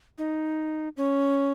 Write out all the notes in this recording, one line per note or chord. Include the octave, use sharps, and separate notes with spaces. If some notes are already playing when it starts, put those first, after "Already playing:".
D#4
C#4